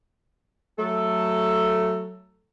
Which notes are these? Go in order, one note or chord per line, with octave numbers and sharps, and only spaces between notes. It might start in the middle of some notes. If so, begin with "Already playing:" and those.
F#3 A3 A4